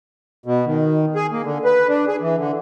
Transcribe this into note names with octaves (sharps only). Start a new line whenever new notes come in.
B2
D#3
G#4
A#3
D3
B4
D4
G#4
E3
D3